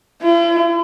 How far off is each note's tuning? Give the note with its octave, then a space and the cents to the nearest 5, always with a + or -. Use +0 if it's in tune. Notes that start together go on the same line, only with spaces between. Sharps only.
E4 +45